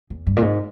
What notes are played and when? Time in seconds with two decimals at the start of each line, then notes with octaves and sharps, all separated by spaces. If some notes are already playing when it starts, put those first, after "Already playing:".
0.10 E2
0.27 G2
0.37 A#2
0.42 G#2